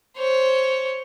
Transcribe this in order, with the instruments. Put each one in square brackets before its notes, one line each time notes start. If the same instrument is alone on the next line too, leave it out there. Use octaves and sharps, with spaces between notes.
[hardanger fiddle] C5 C#5